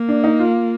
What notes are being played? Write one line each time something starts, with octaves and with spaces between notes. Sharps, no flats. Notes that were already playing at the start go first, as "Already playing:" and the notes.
Already playing: A#3
D4
D#4
F4